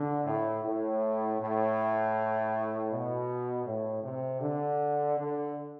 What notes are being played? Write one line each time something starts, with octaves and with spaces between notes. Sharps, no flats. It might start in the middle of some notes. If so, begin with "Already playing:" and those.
Already playing: D3
A2
A2
A2
B2
A2
C3
D3
D3